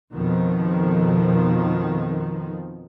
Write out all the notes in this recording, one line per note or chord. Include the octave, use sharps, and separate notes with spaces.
F2 B2 D#3 F3